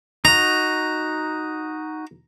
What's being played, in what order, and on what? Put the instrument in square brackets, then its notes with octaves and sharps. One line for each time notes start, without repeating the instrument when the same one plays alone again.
[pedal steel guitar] D#4 F#4 [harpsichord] A#5